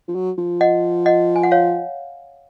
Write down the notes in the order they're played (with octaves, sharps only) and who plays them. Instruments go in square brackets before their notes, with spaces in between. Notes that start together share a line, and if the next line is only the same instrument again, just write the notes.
[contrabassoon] F3
F#3
F3
[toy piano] D#5 F#5
D#5 F#5
G#5
F#5
C#5 F5